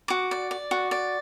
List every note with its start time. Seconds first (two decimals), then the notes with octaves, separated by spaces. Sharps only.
0.08 F#4 D6
0.31 D5
0.51 D5
0.71 F#4
0.91 D5